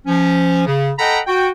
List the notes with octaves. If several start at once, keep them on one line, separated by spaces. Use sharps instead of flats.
F3 C#4
C#3
A4 D#5 F#5 G5 A#5 B5
F#4 G5